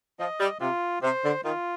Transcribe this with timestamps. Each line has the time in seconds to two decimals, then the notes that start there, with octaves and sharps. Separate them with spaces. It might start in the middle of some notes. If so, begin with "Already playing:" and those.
0.19 F3 D#5
0.40 G3
0.60 C3 F4
1.02 C3 C5
1.24 D3
1.43 D#3 F4